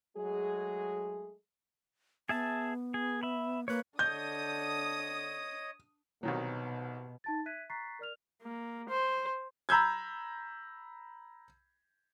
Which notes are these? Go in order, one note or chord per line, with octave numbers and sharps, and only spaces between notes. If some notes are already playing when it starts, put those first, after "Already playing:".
F#3 G#3 A3 G#4
B3 G#4 E5 A5
G#4
E5 B5
A#3 B4 C#5
D3 C#5 D#5 D#6 G6
C2 B2 D#3 F#3
D#4 A5 A6
E5 F#6 G#6 B6 D#7
A#5 C#6 F#6 A6 B6 C7
A#4 D5 F6 F7
A#3
C5
A#5 B5 E6 G6 G#6